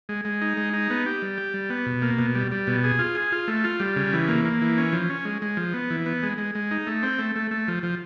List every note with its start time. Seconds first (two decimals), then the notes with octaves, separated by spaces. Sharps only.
0.09 G#3
0.25 G#3
0.42 D#4
0.57 G#3
0.73 D#4
0.90 B3
1.06 G4
1.22 G3
1.38 G4
1.54 G3
1.70 B3
1.86 B2
2.02 A#3
2.19 B2
2.35 G3
2.51 G3
2.67 B2
2.84 G#4
2.99 F4
3.15 G#4
3.32 F4
3.48 A3
3.64 F4
3.80 G3
3.96 C#3
4.13 E3
4.28 A#3
4.45 A#3
4.61 E3
4.78 C#4
4.93 F3
5.09 C#4
5.25 G#3
5.42 G#3
5.57 F3
5.74 B3
5.90 E3
6.06 B3
6.23 G#3
6.38 G#3
6.55 G#3
6.71 D#4
6.87 A3
7.03 C4
7.19 A3
7.36 A3
7.51 A3
7.68 F3
7.83 F3